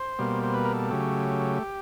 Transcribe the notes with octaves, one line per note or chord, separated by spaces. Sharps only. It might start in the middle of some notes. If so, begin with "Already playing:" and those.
Already playing: C5
B2 G3 A#3
C5
B4
A#4
A4
C#3 F#3 A3 G4